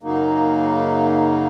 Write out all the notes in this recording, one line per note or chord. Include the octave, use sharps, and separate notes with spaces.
F#2 C#3 F#3 A#3 D#4